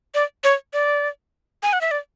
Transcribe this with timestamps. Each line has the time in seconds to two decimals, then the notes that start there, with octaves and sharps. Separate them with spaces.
0.15 D5
0.44 C#5
0.73 D5
1.63 G#5
1.73 F#5
1.81 E5
1.91 D5